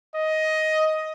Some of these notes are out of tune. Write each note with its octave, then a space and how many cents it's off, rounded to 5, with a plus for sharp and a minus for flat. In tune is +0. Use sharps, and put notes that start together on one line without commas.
D#5 +10